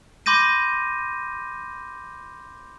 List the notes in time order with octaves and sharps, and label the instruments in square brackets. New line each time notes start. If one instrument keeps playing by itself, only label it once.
[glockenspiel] B5 C6 D6 G6 A#6 D#7